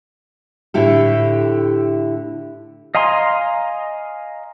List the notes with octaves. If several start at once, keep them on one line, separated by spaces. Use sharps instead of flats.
A2 D3 E4 G4 A4
D#5 F5 G#5 A#5 C6